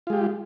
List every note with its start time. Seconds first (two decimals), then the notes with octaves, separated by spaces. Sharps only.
0.07 F4
0.10 G#3
0.13 G4